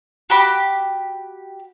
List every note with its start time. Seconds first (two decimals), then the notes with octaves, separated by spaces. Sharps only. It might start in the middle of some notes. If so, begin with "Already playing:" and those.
0.30 F#4 G4 B5 D6